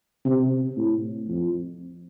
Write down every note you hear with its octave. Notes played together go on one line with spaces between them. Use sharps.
C3
A2
F2